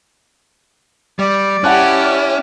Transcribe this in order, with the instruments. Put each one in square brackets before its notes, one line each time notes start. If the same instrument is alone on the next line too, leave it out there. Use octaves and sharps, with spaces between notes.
[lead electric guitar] G3 [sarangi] D5
[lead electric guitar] C#4 [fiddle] E4 G4 [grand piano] F#5 A5 F#6